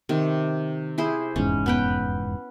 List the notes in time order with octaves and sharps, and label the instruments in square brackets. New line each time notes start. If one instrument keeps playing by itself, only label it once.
[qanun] C3 D#3
E4 G#4 C5
[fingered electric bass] F1 E2 G#2 [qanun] C#4
[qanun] B3 B4 G5